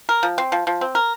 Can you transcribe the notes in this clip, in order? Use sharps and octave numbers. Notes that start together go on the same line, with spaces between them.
A#4
F3
C4
F3
F3
C4
A#4